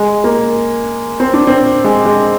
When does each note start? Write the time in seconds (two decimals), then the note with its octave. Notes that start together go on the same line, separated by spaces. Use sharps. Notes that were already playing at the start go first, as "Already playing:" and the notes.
Already playing: G#3
0.24 A#3
1.20 C4
1.34 D4
1.47 C4
1.84 G#3
2.06 G#3